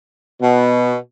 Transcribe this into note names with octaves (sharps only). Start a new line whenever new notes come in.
B2